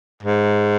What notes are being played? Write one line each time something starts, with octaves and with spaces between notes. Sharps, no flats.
G#2